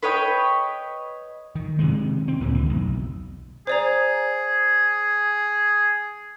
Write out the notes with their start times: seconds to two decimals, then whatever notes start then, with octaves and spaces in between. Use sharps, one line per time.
0.03 B4 C#5 D#5 G5
1.55 D#3
1.79 C3 D#3 G#3
2.28 C4
2.40 D2 G2 A#2 D3
2.54 C#2 E3
2.69 F1 B1
3.67 G#4 C5 D5 A#5